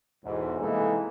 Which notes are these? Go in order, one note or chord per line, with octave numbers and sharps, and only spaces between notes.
B1 E2 G#2
C2 E3 G#3 A#3 D#4 A4